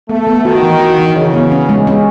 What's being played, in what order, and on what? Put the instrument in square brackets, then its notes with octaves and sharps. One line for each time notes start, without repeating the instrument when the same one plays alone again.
[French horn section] A3 [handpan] B3
[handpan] B3
[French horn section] D#3 [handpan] F#4
[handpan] E3
F#4
E3
[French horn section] C#3 [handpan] E3
[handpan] B3
C#4
G#3
C#4